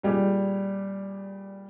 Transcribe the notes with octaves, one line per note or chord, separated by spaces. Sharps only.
A#2 G3 G4 G#4